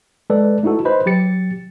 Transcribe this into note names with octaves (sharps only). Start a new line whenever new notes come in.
G#3 A4 B4 D5
A3 D#4 E4 F#4 A4
B4 C5 D#5 B5
F#3 G4 A6 C#7